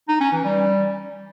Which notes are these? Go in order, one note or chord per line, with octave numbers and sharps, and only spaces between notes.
D#4
C#4
E3
G3